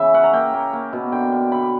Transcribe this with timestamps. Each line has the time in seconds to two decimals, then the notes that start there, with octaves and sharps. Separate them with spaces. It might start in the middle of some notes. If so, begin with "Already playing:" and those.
Already playing: C#3 E3 E5
0.14 C#4 F#5
0.24 A#5
0.33 A#3 G5
0.54 A#3
0.73 A#3
0.93 B2
1.12 D3 G5
1.32 D4
1.52 D3 B5